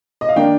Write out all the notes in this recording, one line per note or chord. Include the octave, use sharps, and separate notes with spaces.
D#5
F5
D#3 A#3 D4 G5